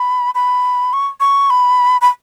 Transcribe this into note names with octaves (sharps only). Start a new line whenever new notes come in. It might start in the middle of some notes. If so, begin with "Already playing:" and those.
Already playing: B5
B5
C#6
C#6
B5
B5